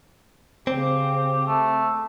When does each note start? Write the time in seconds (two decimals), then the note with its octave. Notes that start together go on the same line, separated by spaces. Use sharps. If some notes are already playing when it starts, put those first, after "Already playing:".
0.67 C#3 C4 G4
1.47 A3